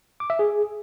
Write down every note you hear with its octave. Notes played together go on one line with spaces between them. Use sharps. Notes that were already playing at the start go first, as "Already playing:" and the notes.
D6
E5
G#4